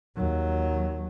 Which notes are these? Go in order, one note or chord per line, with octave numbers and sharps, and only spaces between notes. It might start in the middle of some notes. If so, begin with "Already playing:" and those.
D#2 F#3